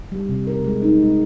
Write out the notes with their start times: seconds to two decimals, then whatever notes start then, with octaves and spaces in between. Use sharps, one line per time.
0.12 G3
0.29 C3
0.47 A#4
0.64 G#3
0.82 D#4
1.00 G#3